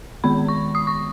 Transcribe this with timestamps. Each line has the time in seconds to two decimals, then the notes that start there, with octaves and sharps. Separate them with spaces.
0.24 D#3 G#3 B3 B5
0.48 C#6
0.75 D#6
0.87 C#6